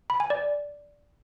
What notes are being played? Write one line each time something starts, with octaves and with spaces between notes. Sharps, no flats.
B5
G#5
D5